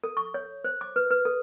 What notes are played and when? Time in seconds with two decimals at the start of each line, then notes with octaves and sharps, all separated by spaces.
0.04 A4
0.17 C#6
0.34 C#5
0.64 C5
0.81 D6
0.96 B4
1.11 B4
1.25 A4